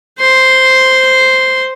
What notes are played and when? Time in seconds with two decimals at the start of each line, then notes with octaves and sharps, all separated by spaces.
0.19 C5 C6